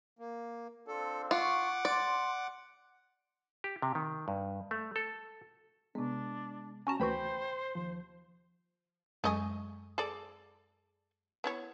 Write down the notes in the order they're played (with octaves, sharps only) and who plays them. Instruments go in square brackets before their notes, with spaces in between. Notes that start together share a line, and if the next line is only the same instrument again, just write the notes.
[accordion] A#3
[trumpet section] C4 D4 F4 [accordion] A4
[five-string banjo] F4 [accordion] F#5 D6 [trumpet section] C#6
[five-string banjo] D5 [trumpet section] C6
[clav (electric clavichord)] G4
C3
D#3
G2
A3
A4
[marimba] C3 B3 [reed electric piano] G#3 [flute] D4
[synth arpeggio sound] C#4 F#4 A5 [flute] A#5
[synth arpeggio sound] D2 E3 F#4 [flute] C5 [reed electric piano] G5 B5 G6
[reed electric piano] D#2 F3
[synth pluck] F#2 G#3 C#6 [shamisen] A3 D#5 G#5
[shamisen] G#4 A4 D5
B3 E4 C#5